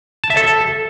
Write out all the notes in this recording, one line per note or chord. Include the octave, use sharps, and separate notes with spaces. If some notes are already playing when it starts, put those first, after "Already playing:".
A5
E5
A4